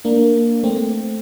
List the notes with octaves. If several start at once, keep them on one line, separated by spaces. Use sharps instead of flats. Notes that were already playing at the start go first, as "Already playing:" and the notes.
A#3 D4
A3 C4